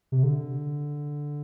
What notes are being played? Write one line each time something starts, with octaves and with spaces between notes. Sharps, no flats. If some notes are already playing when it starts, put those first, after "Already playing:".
C3
D3